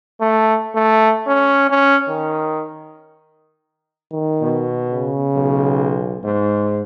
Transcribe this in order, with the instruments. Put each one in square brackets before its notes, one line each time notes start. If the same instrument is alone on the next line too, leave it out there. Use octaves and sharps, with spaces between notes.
[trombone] A3
A3
C#4
C#4
D#3
[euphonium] D#3
[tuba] B2
[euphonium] C#3
[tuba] B1
G#2